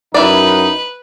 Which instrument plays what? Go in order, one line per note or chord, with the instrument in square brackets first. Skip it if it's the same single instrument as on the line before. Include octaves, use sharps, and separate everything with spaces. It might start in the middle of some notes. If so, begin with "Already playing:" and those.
[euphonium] F#2 [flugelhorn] D#4 [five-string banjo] E4 D5 [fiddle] B4